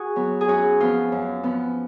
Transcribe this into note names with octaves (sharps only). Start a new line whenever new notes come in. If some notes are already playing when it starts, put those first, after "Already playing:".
Already playing: F#4 G#4
F#3 B3
G#4
F#2 F#4
F3 B3 F4
F#2
F3 B3